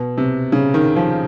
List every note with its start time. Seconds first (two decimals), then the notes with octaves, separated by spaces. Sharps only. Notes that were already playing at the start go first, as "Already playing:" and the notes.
Already playing: B2
0.18 C3
0.52 C#3
0.74 D#3
0.96 F3